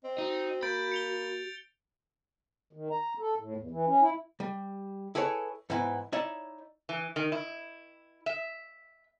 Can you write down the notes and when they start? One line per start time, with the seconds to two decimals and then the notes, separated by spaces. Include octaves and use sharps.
0.04 C4 D#5
0.18 D#4 F#4
0.63 A#3 B5 G6 A6 D7
0.92 C#7 F7 G7
2.73 D#3
2.91 A#5
3.19 A4
3.38 A2
3.57 E2
3.71 E3
3.86 C#4
4.01 E4
4.40 G3
5.15 E4 G#4 A4 B4 C#5
5.70 G#2 E3 B3 E4
6.12 D#4 E4 C#5 D5 E5
6.89 E3
7.16 D#3
7.32 E4
8.26 E5